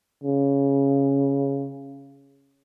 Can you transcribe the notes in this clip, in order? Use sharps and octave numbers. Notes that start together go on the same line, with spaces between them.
C#3